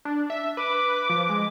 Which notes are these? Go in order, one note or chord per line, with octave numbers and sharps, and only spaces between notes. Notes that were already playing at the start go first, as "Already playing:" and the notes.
D4
E5
B4 D6
F3
G#3